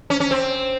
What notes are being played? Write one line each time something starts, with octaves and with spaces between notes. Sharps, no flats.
C#4
C#4
C4